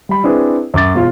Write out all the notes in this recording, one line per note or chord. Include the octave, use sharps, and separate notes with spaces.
G3 B5
C4 D4 E4 G#4 B4
F#2 D6 A6
E1 F4